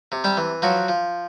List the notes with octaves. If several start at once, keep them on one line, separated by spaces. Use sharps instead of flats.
C3
G3 G4
E3
F3 F#3 F#4
F3